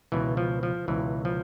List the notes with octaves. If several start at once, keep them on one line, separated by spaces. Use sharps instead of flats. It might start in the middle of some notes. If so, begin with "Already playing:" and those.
C#2 B2 E3
F3
F3
C#2 B2 E3
F3